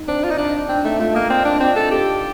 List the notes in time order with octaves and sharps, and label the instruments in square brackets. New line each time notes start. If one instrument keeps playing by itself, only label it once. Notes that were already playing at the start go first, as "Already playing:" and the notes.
Already playing: [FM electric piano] D#4
[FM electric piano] C4 [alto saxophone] D4
[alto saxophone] F4
D#4
D4
[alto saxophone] C4 [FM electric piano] D4
[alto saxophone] A3 [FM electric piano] D#4
[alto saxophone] A3 [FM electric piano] F4
[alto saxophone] A#3 [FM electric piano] D#5
[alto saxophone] C4 [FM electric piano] D5
[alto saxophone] D4
[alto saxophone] C4 [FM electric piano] F4
[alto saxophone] A4
G4